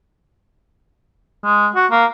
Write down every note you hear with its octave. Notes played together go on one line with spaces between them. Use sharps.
G#3
F#4
A#3